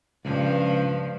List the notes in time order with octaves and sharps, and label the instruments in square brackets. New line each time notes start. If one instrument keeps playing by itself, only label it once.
[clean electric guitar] C#2 [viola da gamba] G2 F3